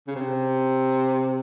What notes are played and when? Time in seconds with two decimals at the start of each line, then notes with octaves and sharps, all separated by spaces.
0.07 C#3
0.15 C3